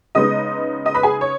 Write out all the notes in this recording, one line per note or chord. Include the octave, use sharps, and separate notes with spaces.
C#3 G#3 B3 D#4 D#5 D#6
D#5 D#6
B4 B5
G#4 G#5
C#5